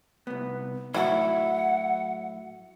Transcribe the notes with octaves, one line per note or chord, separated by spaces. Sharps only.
C2 B3
A2 F#3 E4 F#5